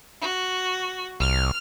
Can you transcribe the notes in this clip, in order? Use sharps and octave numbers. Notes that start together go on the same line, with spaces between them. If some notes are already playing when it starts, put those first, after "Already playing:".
F#4
C2 F6